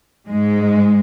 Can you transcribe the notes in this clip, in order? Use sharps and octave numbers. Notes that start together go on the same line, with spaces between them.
G#2 G#3